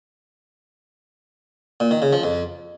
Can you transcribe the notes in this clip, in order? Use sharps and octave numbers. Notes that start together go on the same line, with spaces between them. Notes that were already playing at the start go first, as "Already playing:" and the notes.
A#2
D#3
C#3
F3
F2